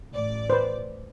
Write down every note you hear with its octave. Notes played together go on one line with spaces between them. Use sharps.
A1 D5
B4 C5